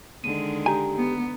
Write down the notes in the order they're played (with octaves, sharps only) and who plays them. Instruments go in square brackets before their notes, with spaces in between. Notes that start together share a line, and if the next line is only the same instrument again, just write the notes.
[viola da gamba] D3 D#3 G#3 [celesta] D#7
[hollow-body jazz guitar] G4 G#5 [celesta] A#5
[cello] B3